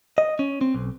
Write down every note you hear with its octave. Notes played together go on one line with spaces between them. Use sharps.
D#5
C#4
C4
B1